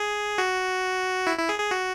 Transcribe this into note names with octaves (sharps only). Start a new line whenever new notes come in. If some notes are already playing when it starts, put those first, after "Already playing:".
Already playing: G#4
F#4
E4
E4
G#4
G#4
F#4